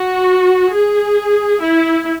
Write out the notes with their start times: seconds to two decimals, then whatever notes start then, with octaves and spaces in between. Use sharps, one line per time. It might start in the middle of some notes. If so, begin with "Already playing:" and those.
Already playing: F#4
0.71 G#4
1.61 E4